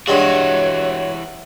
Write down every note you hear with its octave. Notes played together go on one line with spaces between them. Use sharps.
G2 E3 G#3 F#4 C#5 E5 F#5